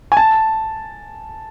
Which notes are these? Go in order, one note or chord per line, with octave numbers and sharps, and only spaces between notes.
G#5
A5